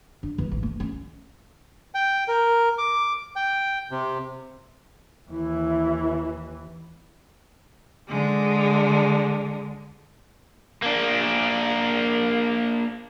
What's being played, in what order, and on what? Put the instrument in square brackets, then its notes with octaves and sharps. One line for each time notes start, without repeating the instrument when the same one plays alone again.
[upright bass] D4
E3
A1
A3
C#4
[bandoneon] G5
A#4
D6
G5
C3
[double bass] D#2 E3 [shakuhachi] E4
[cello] D3 G#3
[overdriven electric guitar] A#3 D4